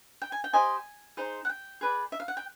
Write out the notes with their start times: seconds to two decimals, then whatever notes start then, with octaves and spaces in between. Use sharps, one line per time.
0.22 G5
0.32 G#5
0.44 G5
0.53 G4 C5 D#5 G#5
1.17 D#4 G#4 C5
1.45 F#5
1.49 G5
1.81 G#4 B4 D5
2.12 E5
2.20 F5
2.28 F#5
2.37 G5